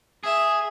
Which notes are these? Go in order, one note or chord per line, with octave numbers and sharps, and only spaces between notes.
G#4 E5